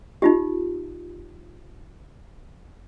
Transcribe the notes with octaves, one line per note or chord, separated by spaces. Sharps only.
D#4 F4 G4